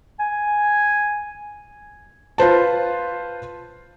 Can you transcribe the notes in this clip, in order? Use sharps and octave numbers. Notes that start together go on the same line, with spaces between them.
G#5
F4 B4 C5 A5